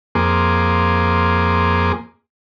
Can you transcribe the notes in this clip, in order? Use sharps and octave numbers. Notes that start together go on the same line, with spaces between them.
F2 A#3 G#4 C6 D6